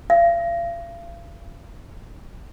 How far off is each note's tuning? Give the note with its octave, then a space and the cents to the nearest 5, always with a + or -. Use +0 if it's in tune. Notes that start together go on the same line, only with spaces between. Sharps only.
F5 -40